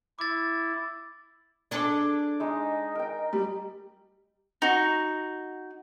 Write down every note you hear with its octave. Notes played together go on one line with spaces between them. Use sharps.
E4 D6 A6
D4 G#4 A4 D5 D6
G#3 D#4 D#5
A#4 G5
G3
D#4 F#4